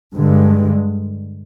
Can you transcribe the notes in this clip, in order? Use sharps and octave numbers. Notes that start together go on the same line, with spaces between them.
G2 D3 G#3